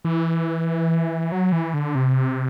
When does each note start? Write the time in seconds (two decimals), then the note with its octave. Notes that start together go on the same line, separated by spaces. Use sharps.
0.05 E3
1.32 F#3
1.52 E3
1.74 D3
1.95 C3